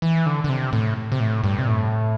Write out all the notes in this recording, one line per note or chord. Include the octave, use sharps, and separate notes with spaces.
E3
D3
D3
C3
A2
C3
A2
G2
C3
A2